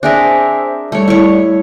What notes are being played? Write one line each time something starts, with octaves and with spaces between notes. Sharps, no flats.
C4 D4 G#4 A#4 C5 E5
G3 A3 C#5
E4 C#5